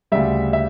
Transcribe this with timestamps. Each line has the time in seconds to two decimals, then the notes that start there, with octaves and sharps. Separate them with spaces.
0.12 D2 C#3 G3 E5
0.53 E5